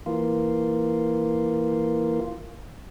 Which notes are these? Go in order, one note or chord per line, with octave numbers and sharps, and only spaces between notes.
E3 A#3 F4